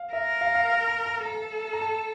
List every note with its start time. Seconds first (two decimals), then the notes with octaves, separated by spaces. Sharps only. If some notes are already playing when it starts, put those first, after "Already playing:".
Already playing: F5
0.13 A#4 E5
0.41 F5
0.55 F5
0.69 F5
0.87 A#5
1.06 A#5
1.25 A4 A#5
1.73 A#5
1.81 A5